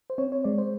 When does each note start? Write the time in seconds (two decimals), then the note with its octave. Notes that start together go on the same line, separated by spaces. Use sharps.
0.10 C5
0.18 C4 C#5
0.32 C#5
0.44 G#3 D5
0.58 C5